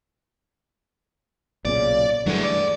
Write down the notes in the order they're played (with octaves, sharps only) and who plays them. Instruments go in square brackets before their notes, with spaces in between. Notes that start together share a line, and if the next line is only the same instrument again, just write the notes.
[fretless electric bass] B1 A#2 C#3 [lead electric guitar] D5
[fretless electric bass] G2 E3 A3 [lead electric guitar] F#3 G#4
[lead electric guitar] D5